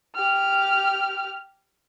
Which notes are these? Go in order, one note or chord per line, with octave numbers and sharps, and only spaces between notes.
G4 F6